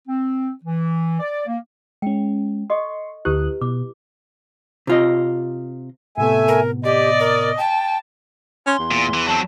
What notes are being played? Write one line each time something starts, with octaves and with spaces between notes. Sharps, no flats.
C4
E3
D5
A#3
G#3 C#4 G5
A4 D#5 C6 C#6
D2 E4 G4 B4 D#6 F#6
B2 D6
C3 F4 D#5
A2 C3 A3 B3 E5 G#5
A#4
G4 D5 D#5
A#4
G5 A5
C#4 C6
E2
A#2
E3
F#3 C4 A5